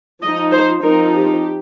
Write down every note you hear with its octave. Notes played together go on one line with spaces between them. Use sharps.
F3 D#4 D#5
C5
F3 C4 D#4 A#4
G4